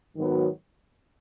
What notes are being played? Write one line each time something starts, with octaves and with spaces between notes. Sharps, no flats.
G#2 D#3 F#3 B3